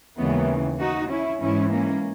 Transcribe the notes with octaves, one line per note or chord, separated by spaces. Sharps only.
D#2 C#3 E3 G#3 B3
D#4 F#4
C#4 E4
G#2 E3 C#4 E4
A#3 C#4